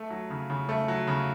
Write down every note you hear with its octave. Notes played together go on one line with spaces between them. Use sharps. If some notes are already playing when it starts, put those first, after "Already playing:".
Already playing: A3
F#3
C#3
C#3
A3
F#3
C#3